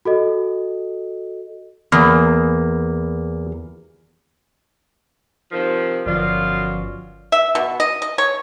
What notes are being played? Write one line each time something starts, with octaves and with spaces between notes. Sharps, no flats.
F#4 A4 D#5
E2 A#3
C3 D#3 F3
G1 F#2 B2 F3 F4 D5
E5
B2
D#5
D#5
C#5